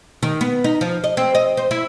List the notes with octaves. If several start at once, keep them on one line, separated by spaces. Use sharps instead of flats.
D#3
B3
D#4
F3
D#5
C4
D#5
C5
E4